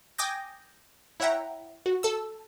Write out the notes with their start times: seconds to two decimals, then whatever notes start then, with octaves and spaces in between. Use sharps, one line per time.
0.18 G5 G#5 D6 D#6 G6 A#6
1.20 E4 C#5 E5 F#5 G5 A#5
1.86 F#4
2.03 A4 E6